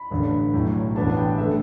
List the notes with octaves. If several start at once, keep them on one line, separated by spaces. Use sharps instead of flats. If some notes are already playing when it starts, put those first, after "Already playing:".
Already playing: B5
A1 G2 D3
B1 A2 F#3
A1 G2 E3 B3 D4 A5
G5
D3 A3 E5